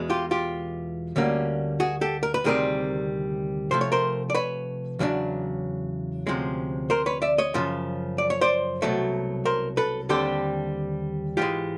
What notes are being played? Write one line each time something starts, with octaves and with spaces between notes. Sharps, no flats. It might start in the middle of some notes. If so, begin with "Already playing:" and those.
Already playing: E2 B2 G#3
F4 G4
F4 G4
D2 D3 G3 A#3 C#4
F#4 G#4
G4 A4
A#4
B4
D2 C3 D#3 G3 C4 G#4 A#4
C3 F3 A3 C5
C#5
A#4 C5
D5
B4 C#5
E2 C#3 F#3 B3 D4
D2 C3 F3 G#3 C#4
A#4 C5
B4 C#5
D5 E5
C#5 D#5
F#2 C#3 F3
D5
C#5
C5 D5
C2 B2 F#3 A3
A#4 C5
A4 B4
D#2 D3 G3 C4 G4 A4
G#2 E3 G#3 F4 G4